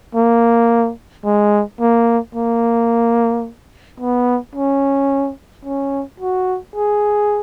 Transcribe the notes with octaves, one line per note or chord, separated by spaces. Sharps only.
A#3
G#3
A#3
A#3
B3
C#4
C#4
F#4
G#4